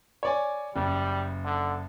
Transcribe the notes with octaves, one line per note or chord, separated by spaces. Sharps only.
C#5 D5 G#5
F#1 G3
D3